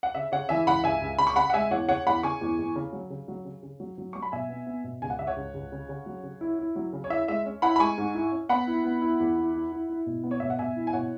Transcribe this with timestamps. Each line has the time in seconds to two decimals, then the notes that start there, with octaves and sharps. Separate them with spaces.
0.03 F#5
0.15 C#3 E5
0.32 C#3 C#5 F#5
0.49 E3 E5 G#5
0.66 C#2 F#5 B5
0.84 C#2 E5 G#5
1.02 C#2
1.18 C#3 B5
1.27 C#6
1.36 C#3 F#5 B5
1.50 F#5
1.54 G#3 E5 G#5
1.71 E2 C#5 F#5
1.88 C#3 C#5 F#5
2.06 E2 F#5 B5
2.23 C#3 G#5 C#6
2.41 E2
2.59 E2
2.75 C#3
2.92 F#3
3.10 C#3
3.28 F#3
3.45 C#3
3.63 C#3
3.80 F#3
3.98 F#3
4.13 F#3 C#6
4.22 B5
4.32 B2 E5 G#5
4.49 B3
4.66 B3
4.84 B2
5.02 C#2 G#5
5.10 F#5
5.19 C#2 E5
5.27 C#5 F#5
5.36 C#2
5.54 C#2
5.72 C#3
5.89 C#3
6.06 F#3
6.23 C#3
6.41 E4
6.59 E4
6.76 F#3
6.93 C#3
7.04 C#5
7.10 E4 E5
7.28 G#3 E5
7.46 C#4
7.62 E4 F#5 B5
7.76 B5
7.80 G#3 G#5 C#6
7.98 G#2
8.15 E4
8.32 C#4
8.49 B3 F#5 B5
8.67 E4
8.84 B3
9.02 E4
9.20 E2
9.36 E4
9.54 E4
9.72 E4
9.89 E4
10.06 B2
10.24 B3
10.31 C#5
10.40 B2 E5
10.50 F#5
10.59 B2 E5 G#5
10.76 E4
10.87 G#5
10.93 B2 C#5 F#5